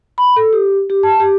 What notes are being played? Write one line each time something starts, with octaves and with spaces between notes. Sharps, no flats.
B5
A4
G4
G4
A5
G4